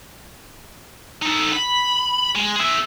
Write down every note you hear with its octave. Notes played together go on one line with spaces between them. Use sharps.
D#4 A4
B5
G#3
G#4 E5